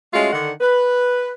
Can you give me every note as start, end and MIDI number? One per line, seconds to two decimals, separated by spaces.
0.13 0.31 56
0.13 0.31 57
0.13 0.31 61
0.13 0.31 65
0.13 0.31 66
0.13 0.31 75
0.33 0.51 50
0.33 0.51 51
0.33 0.51 78
0.61 1.31 71